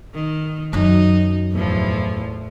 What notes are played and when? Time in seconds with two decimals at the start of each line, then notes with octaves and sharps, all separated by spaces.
0.14 D#3
0.73 F#2 F#3 D#4
1.52 E2 A2 F3